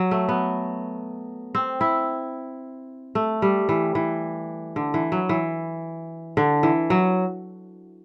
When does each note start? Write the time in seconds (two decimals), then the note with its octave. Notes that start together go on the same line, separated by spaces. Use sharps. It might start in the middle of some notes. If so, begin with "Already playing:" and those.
Already playing: F#3
0.11 A3
0.29 B3
1.55 C4
1.81 E4
3.15 A3
3.42 G3
3.69 E3
3.95 E3
4.76 D3
4.94 E3
5.12 F#3
5.29 E3
6.37 D3
6.63 E3
6.90 F#3